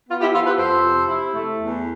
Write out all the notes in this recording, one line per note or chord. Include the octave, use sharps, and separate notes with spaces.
B3 F4
E4 G4
F3 F4 A4
G4 B4
F2 A4 C5
C3
E4
A3
E2